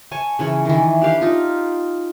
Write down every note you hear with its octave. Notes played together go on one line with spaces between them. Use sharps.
C#5 G#5 A5
C#3 E3 C#5
D#3 E3
D4 G4 F5
D#4 F4